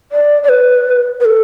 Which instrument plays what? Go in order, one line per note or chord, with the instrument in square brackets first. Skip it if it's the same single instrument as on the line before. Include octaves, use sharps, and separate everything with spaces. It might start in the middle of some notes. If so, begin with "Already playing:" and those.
[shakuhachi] D5
D5
B4
B4
A4